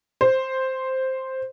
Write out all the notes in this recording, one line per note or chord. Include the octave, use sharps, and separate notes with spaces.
C5